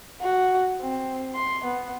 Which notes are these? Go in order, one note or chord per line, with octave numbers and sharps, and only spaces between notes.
F#4
C4
C6
B3